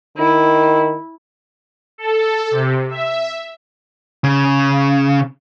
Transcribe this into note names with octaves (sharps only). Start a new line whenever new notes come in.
D#3 E4
A4
C3
E5
C#3